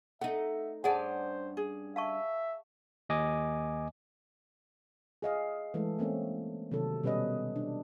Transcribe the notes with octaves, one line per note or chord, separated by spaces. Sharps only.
A3 D#4 E5 F#5
G2 C#4 G#4 C5 D5 F#5 A5
G#4
E5 F5 A5 C#6
D#2 D#5 G#5 D6
G#4 D#5 F5
E3 G#3 A3 A4
A3 A#3 C4 C#4
C3 D#3 F#3 A4
B2 G3 C#4 B4 D#5
D4